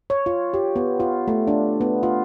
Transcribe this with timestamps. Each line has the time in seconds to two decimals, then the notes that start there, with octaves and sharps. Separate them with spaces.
0.10 C#5
0.26 F4
0.54 G4
0.76 B3
1.00 F4
1.28 A3
1.48 D4
1.81 B3
2.03 F4